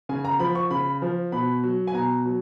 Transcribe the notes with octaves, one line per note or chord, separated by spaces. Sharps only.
C#3 G#5
A#5
F3 B5
C#6
C#3 B5
F3
B2 B5
F#3
G#5
B2 A#5
F#3